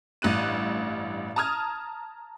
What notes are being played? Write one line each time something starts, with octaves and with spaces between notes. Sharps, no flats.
A1 G2 F#6 D#7
A5 A#5 D#6 F6 G#6